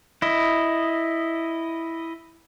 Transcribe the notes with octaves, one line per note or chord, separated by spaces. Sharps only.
E4 D#5